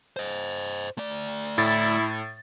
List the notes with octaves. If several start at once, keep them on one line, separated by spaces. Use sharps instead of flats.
C5 D#5
A3 D5
A2 E4 A6